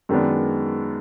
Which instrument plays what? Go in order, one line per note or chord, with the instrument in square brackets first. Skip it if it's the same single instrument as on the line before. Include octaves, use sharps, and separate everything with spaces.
[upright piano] F#2 D#3 G#3 B3 D4